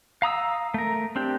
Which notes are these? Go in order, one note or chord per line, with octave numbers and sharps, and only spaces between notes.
F5 A#5 D#6 E6
A3 A#4
C4 D4 G4